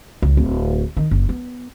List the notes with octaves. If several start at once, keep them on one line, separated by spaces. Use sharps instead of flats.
C#2
D1
D#3
F#1
B3